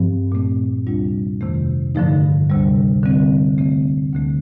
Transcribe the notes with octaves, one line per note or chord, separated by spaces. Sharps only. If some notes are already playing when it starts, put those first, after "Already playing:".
Already playing: G2 F3 C4
A#2 A3 C4
D2 C3 G3 D4 F4
F2 C3 D#3 A3
G2 D3 F3 A3 D#4
D2 C3 G3
D3 G3 C4
D3 A3 C4
D2 D3 A3